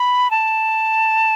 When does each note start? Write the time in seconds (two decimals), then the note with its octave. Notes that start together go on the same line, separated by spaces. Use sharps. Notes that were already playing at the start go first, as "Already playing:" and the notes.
Already playing: B5
0.31 A5